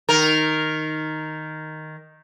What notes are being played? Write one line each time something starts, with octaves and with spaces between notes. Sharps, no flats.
D#3 A#4